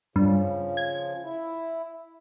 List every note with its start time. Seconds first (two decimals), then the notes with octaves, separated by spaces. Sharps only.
0.16 G2 C#3 F3
0.77 G#6
1.23 E4